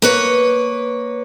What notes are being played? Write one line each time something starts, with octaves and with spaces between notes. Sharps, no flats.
A#3 B4 C#5